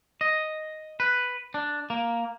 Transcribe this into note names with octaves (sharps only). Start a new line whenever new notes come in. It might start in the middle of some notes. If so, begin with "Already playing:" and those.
D#5
B4
D4
A#3